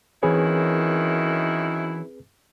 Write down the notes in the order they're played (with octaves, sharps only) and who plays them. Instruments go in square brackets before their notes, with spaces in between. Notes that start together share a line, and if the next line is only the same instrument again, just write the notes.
[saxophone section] F#2 D#3 E4 [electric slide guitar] E3 C#5 [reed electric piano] C4 G#4 B4